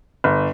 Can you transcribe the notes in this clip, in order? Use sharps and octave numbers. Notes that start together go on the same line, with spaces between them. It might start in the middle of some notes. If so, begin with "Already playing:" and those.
G1